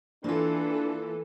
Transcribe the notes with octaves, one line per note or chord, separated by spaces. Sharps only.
E3 A#3 D4 F4 A4